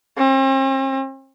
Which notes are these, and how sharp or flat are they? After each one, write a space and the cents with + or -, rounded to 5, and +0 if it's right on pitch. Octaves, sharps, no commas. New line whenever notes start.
C4 +45